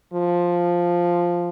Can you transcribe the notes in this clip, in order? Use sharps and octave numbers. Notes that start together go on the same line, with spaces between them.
F3